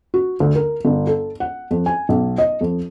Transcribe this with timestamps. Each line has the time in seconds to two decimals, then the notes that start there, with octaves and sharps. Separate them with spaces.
0.14 F#4
0.40 D2
0.55 A#4
0.85 G1
1.07 A4
1.40 F#5
1.71 F2
1.86 G#5
2.09 B1
2.38 D#5
2.61 F2